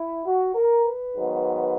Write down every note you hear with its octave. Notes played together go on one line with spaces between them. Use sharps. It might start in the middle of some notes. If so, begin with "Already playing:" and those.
Already playing: E4
F#4
A#4
B4
G#2 D#3 F#3 B3